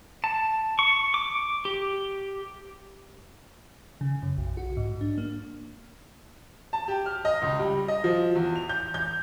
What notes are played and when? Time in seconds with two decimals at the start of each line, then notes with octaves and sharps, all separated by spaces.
0.24 A5
0.79 C#6
1.14 D6
1.65 G4
4.01 C#3
4.23 F#2
4.38 B1
4.57 F#4
4.77 G#2
5.01 D4
5.18 A#3
6.73 A5
6.88 G4
7.06 F6
7.25 D#5
7.42 C#2
7.59 G3
7.88 D#5
8.04 F3
8.35 E2
8.56 F7
8.69 G6
8.94 G6